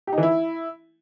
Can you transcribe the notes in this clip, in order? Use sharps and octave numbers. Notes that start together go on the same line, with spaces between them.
G4
D#4
E3
E4